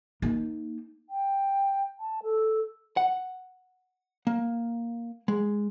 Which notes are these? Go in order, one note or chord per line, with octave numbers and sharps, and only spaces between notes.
A#3 D#4
G5
A5
A4
F#5
A#3
G#3